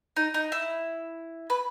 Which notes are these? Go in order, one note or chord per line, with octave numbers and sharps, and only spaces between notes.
D#4
D#4
E4
B4